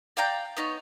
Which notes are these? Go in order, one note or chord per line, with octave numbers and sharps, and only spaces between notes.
D5 F5 G5 A#5
B3 D#4 C#5